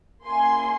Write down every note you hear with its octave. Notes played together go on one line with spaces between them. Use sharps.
A#3 C#4 E4 G#4 G#5 C6